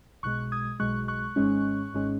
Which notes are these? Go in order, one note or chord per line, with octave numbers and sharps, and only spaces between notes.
B1 B2 G#3 C#6 F#6
D#6 G#6
B1 B2 G#3 C#6 F#6
C#6 F#6
G#1 G#2 G#3 C#4
G#1 G#2 G#3 C#4